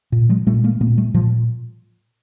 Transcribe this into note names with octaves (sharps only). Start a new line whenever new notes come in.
A#2
F#3 G#3
A#2 G3 A3
G#3 A#3
A#2 A3 B3
G3 A3
A#2 F3 G3